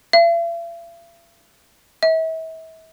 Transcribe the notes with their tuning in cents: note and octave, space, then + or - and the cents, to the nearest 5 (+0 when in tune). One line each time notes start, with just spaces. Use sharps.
E5 +45
E5 -40